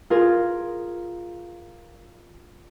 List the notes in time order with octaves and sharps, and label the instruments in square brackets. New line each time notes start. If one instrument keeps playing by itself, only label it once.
[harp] F4 G#4 A#4